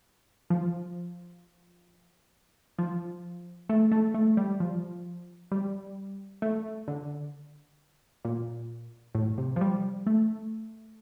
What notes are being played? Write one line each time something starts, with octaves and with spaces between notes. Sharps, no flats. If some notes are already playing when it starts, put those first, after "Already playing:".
F3
F3
A3
A3
A3
G3
F3
G3
A3
D3
A#2
A2
C3
F3
G3
A3